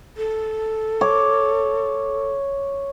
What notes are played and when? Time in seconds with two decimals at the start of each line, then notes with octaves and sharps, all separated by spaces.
0.17 A4
1.01 C#5 D6